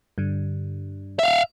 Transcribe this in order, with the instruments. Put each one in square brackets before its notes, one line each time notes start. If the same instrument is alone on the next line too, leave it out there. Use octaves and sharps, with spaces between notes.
[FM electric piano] G2 D3
[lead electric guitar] E5 F5